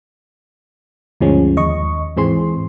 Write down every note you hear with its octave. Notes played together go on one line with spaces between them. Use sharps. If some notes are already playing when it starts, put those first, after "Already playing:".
D2 G2 F3 G#3 C#4
D#2 D#5 C#6
G#2 E3 C4 G#4 C6